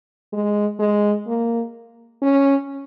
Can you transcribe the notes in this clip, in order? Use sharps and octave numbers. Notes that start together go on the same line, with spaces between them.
G#3
G#3
A#3
C#4